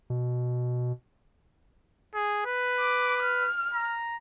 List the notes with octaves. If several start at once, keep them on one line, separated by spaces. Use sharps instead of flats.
B2
G#4
B4
D6
F6
A#5